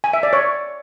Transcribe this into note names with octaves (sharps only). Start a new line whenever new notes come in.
G#5
E5
D5
C#5